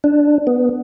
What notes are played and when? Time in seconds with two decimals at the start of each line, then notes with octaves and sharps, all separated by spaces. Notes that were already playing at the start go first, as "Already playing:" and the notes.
0.04 D4
0.47 B3